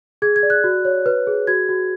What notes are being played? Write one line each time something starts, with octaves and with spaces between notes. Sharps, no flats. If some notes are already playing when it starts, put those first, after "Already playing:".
G#4 G#6
G#6
D5
F#6
F#4
C#5
B4
G#4
F#4 G#6
F#4